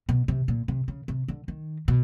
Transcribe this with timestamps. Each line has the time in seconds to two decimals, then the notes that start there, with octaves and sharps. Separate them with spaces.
0.09 B2
0.28 C3
0.48 A#2
0.68 C3
0.88 C#3
1.08 C3
1.28 D3
1.48 D#3
1.88 B2